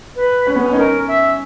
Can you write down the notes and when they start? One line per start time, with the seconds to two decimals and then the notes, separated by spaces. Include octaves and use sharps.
0.16 B4
0.47 C#4
0.56 B3
0.66 C#4
0.73 D#4
0.77 C#4 A#4
1.08 E5